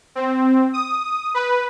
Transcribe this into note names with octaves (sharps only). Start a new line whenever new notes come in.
C4
D#6
B4